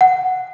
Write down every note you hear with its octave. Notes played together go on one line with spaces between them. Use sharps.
F#5